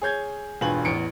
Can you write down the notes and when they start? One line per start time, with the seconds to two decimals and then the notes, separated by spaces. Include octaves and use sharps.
0.02 G#4 C#5 G6 G#6
0.61 E1 G2 F4 B4 G#5 F#7
0.85 A1 E2 C#7 D7